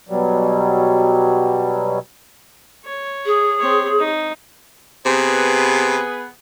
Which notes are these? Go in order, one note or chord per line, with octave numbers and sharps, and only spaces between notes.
B2 F#3 G3
C#5
G#4
C4 C#5
D#4
C3 B3 G#4 B4